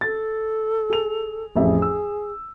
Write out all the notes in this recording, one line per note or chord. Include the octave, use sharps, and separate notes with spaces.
A4 A6
G#4 F7
A1 F2 G#4 E5
E6